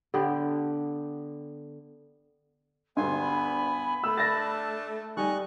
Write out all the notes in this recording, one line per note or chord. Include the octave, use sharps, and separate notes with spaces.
D3 B3 G4
D2 G2 B3 G#5 C6
B5
A3 E6
D4 A5 A6 A#6
G3 D#4 G#5 C#6 F#6